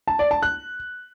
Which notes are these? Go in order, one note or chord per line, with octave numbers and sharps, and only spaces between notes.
A5
D5
A5
F#6